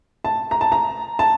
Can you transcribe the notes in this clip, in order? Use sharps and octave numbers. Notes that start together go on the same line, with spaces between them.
A5
A#5
A5
A#5
A5